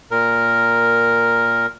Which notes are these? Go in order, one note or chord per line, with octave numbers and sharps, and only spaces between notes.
A#2 A#4